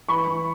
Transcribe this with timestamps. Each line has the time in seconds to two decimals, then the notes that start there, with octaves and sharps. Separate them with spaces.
0.08 E3 B5 C#6
0.27 E3